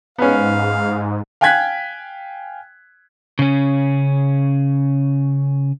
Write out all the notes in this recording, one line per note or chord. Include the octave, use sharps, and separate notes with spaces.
G#2 B3 C#4 F5
F5 G5 G#5 F#6 G#6 B6
C#3 C#4